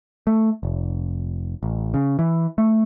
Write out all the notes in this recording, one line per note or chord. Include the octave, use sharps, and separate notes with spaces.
A3
F1
A1
C#3
E3
A3